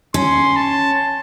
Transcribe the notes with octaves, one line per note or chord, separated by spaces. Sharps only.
C#4 C6
A5